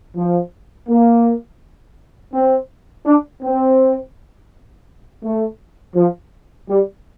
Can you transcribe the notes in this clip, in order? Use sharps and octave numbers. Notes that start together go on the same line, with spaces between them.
F3
A#3
C4
D4
C4
A3
F3
G3